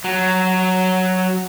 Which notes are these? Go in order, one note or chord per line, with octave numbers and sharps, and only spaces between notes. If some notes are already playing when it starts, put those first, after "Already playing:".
F#3